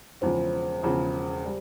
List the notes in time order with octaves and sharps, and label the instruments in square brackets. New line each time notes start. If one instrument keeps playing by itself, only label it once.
[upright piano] E1 E2 C#3 F3 [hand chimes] C5
[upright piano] E1 E2 C#3 F3
G3